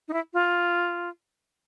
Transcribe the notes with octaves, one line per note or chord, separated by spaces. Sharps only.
D#4
E4
F4